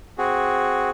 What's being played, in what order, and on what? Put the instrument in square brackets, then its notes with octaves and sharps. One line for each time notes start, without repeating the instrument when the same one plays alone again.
[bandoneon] C4 F#4 G#4